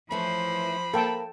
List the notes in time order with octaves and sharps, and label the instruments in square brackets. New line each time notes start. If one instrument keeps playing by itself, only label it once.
[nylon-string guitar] E3 A3 C#4 [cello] F3 C5 [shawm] B5
[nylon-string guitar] A#3 [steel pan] A4 G5 A5